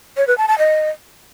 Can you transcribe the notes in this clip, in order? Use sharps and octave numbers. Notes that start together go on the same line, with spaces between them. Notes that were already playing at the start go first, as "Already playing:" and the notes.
C#5
B4
A5
A5
D#5